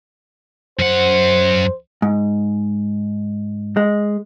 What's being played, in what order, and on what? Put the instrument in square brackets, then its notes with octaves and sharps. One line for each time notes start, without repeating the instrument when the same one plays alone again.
[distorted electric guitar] F#2 F#5 [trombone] C5
[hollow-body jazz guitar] G#2
G#3